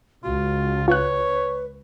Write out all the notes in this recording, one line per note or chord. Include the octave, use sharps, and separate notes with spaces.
C#2 F4 F#4
F4 B4 C#5 F#6